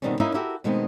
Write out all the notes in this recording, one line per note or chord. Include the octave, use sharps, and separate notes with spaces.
B2 D3 D#3 G3 C4 C#4
A#3 C#4 D#4 E4 A#4 F5
E4 F#4 G4 A4 A#4
B2 D#3 G#3 A3 B3 C4